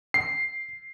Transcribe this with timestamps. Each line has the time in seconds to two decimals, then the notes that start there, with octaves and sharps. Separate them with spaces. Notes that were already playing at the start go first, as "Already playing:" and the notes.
0.14 C7